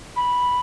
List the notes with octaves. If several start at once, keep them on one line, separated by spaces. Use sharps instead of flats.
B5